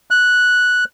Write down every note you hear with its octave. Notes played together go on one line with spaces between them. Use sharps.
F#6